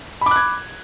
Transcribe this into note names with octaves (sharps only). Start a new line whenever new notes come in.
B5 D6 F#6 G#6